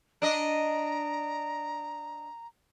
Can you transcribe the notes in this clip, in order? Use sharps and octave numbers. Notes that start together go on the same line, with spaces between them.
D4 D#5 A#5